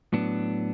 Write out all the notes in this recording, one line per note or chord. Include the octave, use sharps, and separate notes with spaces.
A2 F#3 B3 D4